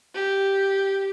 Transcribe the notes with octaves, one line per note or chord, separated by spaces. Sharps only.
G4